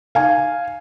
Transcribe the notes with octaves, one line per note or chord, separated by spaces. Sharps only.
F5 G#5